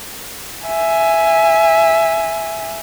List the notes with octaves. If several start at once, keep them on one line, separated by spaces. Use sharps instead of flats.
E5 G#5